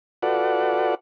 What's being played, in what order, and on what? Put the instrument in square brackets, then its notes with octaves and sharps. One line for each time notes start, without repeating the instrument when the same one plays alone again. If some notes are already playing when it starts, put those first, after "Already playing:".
[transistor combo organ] F4 F#4 A4 B4 D5 F#5